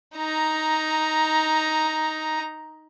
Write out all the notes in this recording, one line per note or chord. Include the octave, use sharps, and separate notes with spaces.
D#4 A#5